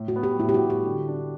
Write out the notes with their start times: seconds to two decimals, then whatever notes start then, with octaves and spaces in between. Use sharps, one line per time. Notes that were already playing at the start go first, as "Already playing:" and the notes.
Already playing: A2
0.08 F#4
0.16 B3
0.23 G4
0.40 A2 E4
0.49 G4
0.54 F#4
0.61 A2
0.70 G4
0.86 D3
1.08 D4